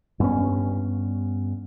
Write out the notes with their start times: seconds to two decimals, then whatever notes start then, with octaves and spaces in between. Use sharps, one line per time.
0.20 G2 B3 C#4